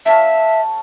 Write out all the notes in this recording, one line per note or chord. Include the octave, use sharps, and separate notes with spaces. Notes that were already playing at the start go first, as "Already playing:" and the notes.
A4 C#5 E5 F5